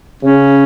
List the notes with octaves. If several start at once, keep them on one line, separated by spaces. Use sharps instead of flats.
C#3 C#4